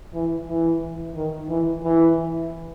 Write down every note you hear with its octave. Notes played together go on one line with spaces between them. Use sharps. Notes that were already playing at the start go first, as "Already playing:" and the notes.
E3
E3
D#3
E3
E3